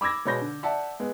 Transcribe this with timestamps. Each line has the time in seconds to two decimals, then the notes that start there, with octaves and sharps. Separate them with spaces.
0.01 B5 D6 E6 G#6 A#6
0.25 B2 G#3 C#5 B5 G6 A#6
0.41 D3
0.63 D5 E5 F#5 A5
1.00 G#3 B3